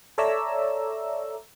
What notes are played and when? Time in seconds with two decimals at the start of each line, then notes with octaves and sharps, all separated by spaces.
0.18 A4 C#5 D5 E5 A#5 E6